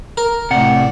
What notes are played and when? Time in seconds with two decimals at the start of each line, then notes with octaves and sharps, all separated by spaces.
0.17 A#4
0.51 A2 C3 A3 D5 F#5